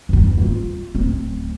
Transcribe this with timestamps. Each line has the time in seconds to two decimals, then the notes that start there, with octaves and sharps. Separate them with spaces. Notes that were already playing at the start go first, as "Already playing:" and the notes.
0.09 E2 G2
0.42 F4
0.95 D1 C4